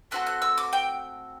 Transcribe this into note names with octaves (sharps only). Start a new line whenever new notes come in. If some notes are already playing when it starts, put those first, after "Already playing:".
A3 C4 F#4 A4 F#6
F#6
E6
D6
G5